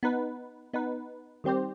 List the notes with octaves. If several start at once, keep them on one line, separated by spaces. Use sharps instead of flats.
B3 D#4 B4
B3 D#4 B4
D#3 G3 C4 G4 C5